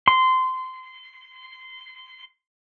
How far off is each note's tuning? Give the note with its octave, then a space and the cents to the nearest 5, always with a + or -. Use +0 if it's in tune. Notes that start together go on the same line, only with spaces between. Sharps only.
C6 -20